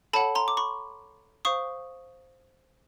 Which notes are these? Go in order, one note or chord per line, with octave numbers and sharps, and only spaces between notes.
A4 C#5 F#5 A5 B5
A#5 C6
D6
B5 C#6
C5 F5 C#6 D#6